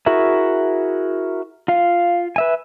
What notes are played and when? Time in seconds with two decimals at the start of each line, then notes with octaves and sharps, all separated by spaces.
0.06 E4 F#4 G#4 A#4 E5
1.68 F4 F5
2.36 B4 E5 G#5